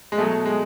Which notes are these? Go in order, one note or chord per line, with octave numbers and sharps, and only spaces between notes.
G#3
B2 F#3 A3
G#3